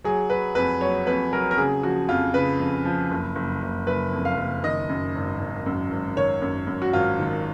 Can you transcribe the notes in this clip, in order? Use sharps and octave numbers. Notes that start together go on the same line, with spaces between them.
F#3 G#4
F#3 B4
F2 B4
F#3 C#5
F2 B4
F#3 A#4
A#4
C#3 G#4
F3 F#4
F2 F4
C#3 B4
F2
F3
F#1
F#1
F#1
F#1 B4
F2
F5
F#1
D#3 D#5
F#2
G#1
G#1
F#2
G#1
D#3 C#5
F#2
F#2
F#4
G#1 F4
D#3